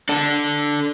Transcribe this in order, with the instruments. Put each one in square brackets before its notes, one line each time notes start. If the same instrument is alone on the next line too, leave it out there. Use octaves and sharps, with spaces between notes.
[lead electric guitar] D4 A4